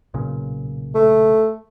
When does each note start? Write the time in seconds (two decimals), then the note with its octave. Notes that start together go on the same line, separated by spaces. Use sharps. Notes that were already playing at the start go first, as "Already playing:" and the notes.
0.14 B1 A#2 C#3
0.95 A3